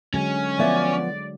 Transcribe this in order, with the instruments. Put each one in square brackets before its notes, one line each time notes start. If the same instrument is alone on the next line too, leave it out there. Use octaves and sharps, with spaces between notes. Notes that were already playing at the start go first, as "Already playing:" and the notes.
[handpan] D3 F#3 G#3 [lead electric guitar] C#4
[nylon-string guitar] F3 B3 E5 [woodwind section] D5